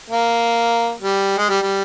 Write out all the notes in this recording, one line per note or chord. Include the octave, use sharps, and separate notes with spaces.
A#3
G3
G#3
G3
G3